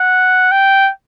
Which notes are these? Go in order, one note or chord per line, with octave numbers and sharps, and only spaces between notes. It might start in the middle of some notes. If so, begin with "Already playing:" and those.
Already playing: F#5
G5